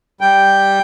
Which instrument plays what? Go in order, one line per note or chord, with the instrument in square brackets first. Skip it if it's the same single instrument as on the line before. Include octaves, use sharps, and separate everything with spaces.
[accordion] G3 G5